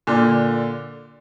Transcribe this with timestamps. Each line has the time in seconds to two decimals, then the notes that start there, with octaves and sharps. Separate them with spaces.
0.07 A#2 D3